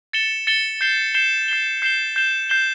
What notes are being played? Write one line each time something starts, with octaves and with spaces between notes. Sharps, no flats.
A6 C#7 E7 G7
A6 C#7 E7 G7
G6 C7 E7 G7
G6 C7 E7 G7
G6 C7 E7 G7
G6 C7 E7 G7
G6 C7 E7 G7
G6 C7 E7 G7